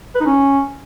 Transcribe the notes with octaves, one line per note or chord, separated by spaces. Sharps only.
B4
D#4
C#4